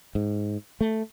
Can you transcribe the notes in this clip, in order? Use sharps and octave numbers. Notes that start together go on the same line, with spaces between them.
G#2
A3